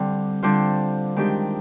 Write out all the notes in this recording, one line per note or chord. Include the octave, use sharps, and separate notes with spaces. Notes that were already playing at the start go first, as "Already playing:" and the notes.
Already playing: D3 G3 C4
D3 G3 D4 F4 C5
D#3 G#3 D4 G4